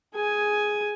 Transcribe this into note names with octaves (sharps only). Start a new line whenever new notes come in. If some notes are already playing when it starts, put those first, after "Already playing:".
G#4 G#5